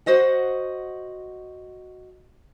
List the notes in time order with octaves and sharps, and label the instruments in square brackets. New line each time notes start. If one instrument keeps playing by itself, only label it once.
[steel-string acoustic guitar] F#4 C5 D#5 F#5